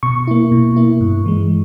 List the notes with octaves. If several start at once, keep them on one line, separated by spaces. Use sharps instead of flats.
B2 C#6
A#3 E4
B2
A#3 E4
G2
E3 G#3